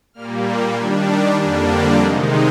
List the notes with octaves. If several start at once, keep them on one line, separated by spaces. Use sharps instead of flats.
A#2 G3 A#3 F6
C6
D#3 G3 D4 G#6
A#5
F2 D3 G3 A#3 D4 G#5
G5
C3 D#3 G#3 D#4 D#5